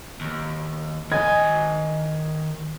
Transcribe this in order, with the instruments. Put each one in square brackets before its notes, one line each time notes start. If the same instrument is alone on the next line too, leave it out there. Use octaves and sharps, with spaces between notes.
[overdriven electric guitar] D#2
[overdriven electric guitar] D#3 G#5 [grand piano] D#5 G#6